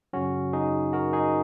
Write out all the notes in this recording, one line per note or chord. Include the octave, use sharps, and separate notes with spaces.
F#2 C#3 F#3 C#4 F#4
D#4 G#4
F#4 A#4
D#4 G#4